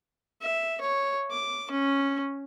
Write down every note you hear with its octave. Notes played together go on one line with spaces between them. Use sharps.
E5
C#5
D6
C#4